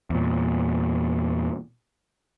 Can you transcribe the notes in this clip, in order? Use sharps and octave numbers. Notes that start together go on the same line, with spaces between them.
E2 A#2